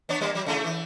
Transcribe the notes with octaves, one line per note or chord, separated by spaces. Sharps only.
B3 D4 C#5
G3 A#3
F#3
C#3 A3 E4
E3